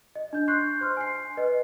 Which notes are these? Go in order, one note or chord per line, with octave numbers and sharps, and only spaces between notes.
D#5
D4 G6
C6 C#6 F#6 G6 C7
C5 C6 F6
G#5 C7
B4 D#5